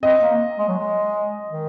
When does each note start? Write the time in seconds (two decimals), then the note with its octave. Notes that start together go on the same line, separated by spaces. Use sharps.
0.03 C4 D#5
0.21 A#3
0.58 G#3
0.68 F#3
0.78 G#3
1.50 D#3